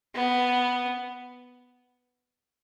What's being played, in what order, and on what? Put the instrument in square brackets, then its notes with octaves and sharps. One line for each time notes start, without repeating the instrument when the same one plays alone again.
[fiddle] B3